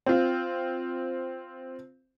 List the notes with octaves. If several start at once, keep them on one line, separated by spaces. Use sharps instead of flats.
C4 F4